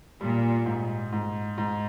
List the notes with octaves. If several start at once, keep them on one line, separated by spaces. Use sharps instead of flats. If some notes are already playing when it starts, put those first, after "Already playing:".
A#2 G3
G#2
G#2
G#2